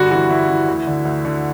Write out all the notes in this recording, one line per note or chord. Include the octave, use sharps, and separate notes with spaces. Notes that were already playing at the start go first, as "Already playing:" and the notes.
Already playing: G2 D3 F#4
E3 F#4
G2 E4
E3
D2
D3
D2
D3